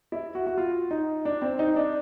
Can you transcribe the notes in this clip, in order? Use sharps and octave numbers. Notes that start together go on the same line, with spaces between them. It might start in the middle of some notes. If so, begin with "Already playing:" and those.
E4
F#4
F#4
F4
D#4
D4
C4
D#4
D4